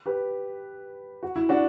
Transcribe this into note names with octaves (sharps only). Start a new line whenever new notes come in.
G4 B4
F#4
E4
D4 F#4